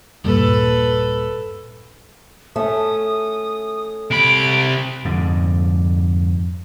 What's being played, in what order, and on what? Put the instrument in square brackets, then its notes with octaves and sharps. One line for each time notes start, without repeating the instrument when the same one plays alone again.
[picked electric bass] D#1 G2 A#2 [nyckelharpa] A4 B4
[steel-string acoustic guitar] A3 C#4 [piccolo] D#6
[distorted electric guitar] C3 B5 [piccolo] D7
[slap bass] F2 G#2 D3